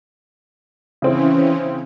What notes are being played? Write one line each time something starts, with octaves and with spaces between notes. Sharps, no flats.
C#3 E3 C4 C#4 E4